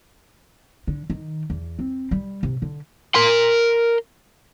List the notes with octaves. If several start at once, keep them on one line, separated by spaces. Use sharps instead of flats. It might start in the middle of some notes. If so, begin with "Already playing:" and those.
D3
D#3
E2
C4
G3
C3
D3
A#4 C6